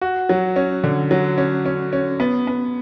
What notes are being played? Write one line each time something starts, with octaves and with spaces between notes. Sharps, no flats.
F#4
F#3
C#4
D3
F#3
C#4
C#4
C#4
B3
B3